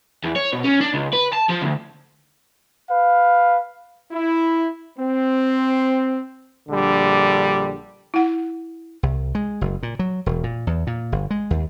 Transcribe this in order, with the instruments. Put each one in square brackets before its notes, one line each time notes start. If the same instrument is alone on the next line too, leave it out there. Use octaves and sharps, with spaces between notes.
[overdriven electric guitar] E2
C#5
B2
C#4
D4
C#2
B4
A5
F3
D2
[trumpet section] B4 F5
[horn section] E4
C4
[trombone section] A#1 D3 G3
[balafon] E4 F#5
[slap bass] C2
G#3
F#1
A#2
F#3
E1
A#2
E2
A#2
G1
G#3
D#2